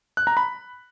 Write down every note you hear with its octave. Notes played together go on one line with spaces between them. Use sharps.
F#6
A#5
B5